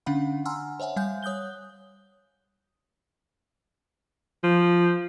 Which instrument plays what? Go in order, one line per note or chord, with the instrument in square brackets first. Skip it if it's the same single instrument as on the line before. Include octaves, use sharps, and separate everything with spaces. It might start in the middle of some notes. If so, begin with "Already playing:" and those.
[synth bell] D3 C#4 D4 F5 F#5 B5
F#5 G#5 A#5 C6 E6 F6
C5 C#5 E5 F#5 G#5
G3 F5 F#5 G#5 G6
C#5 D#6 F#6 G6 G7
[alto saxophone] F3